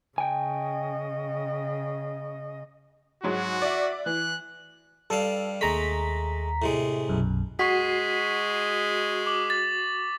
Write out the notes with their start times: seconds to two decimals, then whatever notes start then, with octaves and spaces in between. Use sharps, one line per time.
0.18 C#3 D#5 G5 G#5
3.24 G#2 F#3 G#3 F#4
3.62 D5 E5
4.06 E3 F#6
5.10 G2 G3 A4 F5
5.61 D#2 G#3 A3 A#5 B6
6.62 A2 C3 G#3
7.09 B1 F#2
7.59 G#3 F#4 C#6 B6 C7
9.27 D6 F#7
9.50 A6